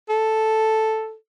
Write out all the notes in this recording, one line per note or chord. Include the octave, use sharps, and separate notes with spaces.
A4